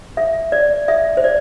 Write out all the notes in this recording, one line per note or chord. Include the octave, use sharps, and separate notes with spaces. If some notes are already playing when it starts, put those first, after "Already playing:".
E5
D5
E5
C5
D5